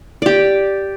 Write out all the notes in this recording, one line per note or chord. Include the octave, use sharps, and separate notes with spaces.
G4 D5